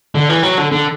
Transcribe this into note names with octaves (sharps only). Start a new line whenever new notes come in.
D3
E3
F#3
D3
D3